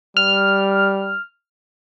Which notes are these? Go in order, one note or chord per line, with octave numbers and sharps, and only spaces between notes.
G3 F6